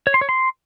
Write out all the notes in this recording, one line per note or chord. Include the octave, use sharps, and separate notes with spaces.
C#5
C6
C#5
C6